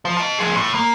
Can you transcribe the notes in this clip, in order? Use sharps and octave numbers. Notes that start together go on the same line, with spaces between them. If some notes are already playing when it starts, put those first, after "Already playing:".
F3
D#5 A5
F3 G#4
A2
A#3